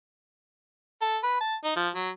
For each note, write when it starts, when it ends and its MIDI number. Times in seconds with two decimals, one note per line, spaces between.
1.02 1.18 69
1.24 1.37 71
1.41 1.56 81
1.64 1.72 63
1.76 1.89 53
1.95 2.10 54